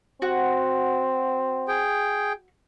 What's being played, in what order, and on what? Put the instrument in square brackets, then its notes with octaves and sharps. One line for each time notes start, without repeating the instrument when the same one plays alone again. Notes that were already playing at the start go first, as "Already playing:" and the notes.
[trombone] C4 [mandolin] F#4
[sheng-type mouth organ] G#4 G5